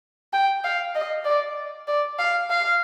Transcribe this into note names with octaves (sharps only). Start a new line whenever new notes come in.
G5
F5
D#5
D5
D5
F5
F5